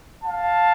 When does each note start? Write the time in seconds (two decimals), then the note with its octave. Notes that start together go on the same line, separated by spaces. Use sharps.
0.24 F5 A5